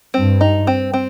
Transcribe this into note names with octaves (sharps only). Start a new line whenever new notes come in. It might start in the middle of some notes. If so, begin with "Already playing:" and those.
G2 C4
D#4
C4
C4